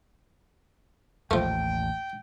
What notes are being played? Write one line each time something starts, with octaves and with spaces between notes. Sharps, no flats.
A1 D#2 F3 A3 G5